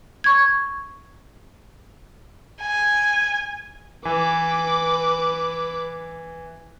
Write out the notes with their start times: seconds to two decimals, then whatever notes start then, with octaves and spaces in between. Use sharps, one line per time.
0.24 C#6 G#6
2.62 G#5
4.05 E3 B4 D6